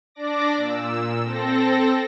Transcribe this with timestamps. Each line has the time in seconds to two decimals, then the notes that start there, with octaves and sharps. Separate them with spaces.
0.15 D4 D5 D6 A#6
0.56 A#2 E6
1.24 C4 A4 A#6